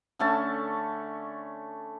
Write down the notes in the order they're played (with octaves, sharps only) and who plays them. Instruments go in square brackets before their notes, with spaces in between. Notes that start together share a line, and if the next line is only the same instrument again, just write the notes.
[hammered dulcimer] D3 A3 C#4 A5